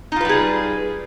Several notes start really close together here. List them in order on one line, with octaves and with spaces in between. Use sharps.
D#4 F4 B4 G3 G#4